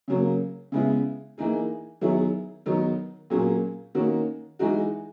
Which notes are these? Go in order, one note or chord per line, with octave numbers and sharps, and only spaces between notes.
C#3 F#3 A#3
C#3 G#3 B3 E4 G#4
E3 A#3 D#4 G#4
D#3 F#3 B3 E4 G#4
D#3 F#3 B3 D#4
A#2 F#3 A#3 C#4 G#4
D#3 A#3 C#4 F#4
E3 G#3 D#4 F#4